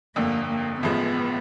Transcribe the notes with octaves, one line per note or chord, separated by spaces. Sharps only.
G1 F2 D3 A#3
A#3
A1 A2 F3 G#3 B3